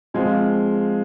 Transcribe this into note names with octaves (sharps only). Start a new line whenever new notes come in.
F3 G#3 C4 F4